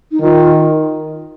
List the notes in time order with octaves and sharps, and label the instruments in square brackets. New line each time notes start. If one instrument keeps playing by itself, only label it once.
[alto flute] D#4
[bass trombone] D#3 [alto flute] F4